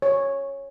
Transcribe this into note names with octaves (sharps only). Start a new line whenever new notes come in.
C#5